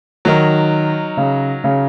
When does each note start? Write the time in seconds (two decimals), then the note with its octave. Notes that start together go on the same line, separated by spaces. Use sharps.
0.25 D#3 F#3 D#4 A#4
1.17 C#3
1.64 C#3